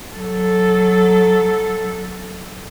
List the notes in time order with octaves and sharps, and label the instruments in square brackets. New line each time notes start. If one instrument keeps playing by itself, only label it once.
[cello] F#3 A4